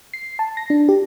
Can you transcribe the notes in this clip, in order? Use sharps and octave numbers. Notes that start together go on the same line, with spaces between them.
C7
A5
A#6
D4
G4